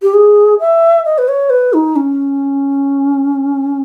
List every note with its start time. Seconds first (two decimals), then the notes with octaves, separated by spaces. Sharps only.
0.02 G4
0.14 G#4
0.60 E5
1.05 D#5
1.18 B4
1.28 C#5
1.50 B4
1.73 D#4
1.96 C#4